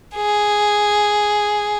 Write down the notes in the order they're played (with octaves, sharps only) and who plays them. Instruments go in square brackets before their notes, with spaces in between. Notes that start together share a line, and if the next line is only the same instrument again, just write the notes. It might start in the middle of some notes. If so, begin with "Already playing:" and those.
[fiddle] G#4